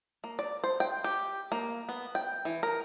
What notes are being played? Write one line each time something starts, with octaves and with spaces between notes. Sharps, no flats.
A#3
D5
C5
G5
G4
A#3
B3
G5
E3
A#4